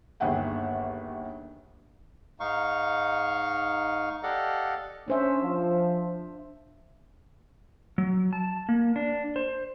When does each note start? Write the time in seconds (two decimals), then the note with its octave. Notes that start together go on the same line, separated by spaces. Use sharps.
0.20 G1 D#2 G#4 E5 F#5 G5
2.40 G#2 D#4 F5 C#6
4.23 G4 A4 D5 D#5 F5 F#5
5.08 C#4 D4 C5 E5
5.44 F3
7.98 F#3
8.33 A5
8.69 A#3
8.96 D4
9.36 C5